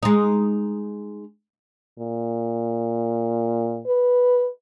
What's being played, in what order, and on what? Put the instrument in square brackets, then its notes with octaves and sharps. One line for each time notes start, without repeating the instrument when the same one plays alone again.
[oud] G#3 D#4
[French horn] A#2
B4